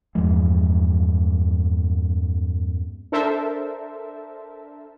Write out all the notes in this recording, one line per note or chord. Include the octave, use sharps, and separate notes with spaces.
E2 G2 F3 G#3
D4 A4 A#4 C5 E5 A5